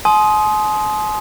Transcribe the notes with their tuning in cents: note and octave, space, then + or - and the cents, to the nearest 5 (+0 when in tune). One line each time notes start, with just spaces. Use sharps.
G#5 +45 C6 +0 D#6 +10